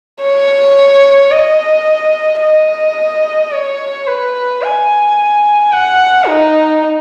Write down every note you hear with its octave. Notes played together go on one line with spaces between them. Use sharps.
C#5
D#5
D#5
C#5
B4
G#5
F#5
D#4